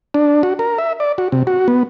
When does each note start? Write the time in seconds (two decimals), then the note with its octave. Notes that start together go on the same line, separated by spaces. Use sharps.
0.14 D4
0.43 F#4
0.59 A#4
0.78 E5
1.00 D5
1.18 F#4
1.32 C3
1.47 F#4
1.68 B3